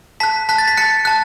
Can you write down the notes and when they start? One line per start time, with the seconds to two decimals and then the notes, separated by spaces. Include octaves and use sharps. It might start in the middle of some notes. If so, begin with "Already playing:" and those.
0.20 A5 F#6 B6
0.49 A5 F#6 B6
0.58 A6
0.68 B6
0.77 A5 F#6 C#7
1.05 A5 F#6